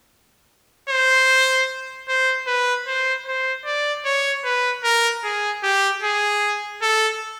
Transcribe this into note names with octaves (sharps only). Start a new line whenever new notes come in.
C5
C5
B4
C5
C5
D5
C#5
B4
A#4
G#4
G4
G#4
A4